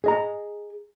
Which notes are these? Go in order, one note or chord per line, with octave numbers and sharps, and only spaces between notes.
G#4 D#5 A#5